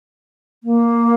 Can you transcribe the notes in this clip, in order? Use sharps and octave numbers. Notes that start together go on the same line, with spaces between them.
A#3